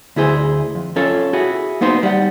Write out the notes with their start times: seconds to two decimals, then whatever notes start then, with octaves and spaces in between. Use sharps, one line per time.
0.16 D2 E4 G#4 C5
0.75 F2
0.96 C#4 F4 A4 C#5
1.33 E4 F#4 G#4
1.81 A#3 B3 D#4 C5 C6
2.03 G3 F#5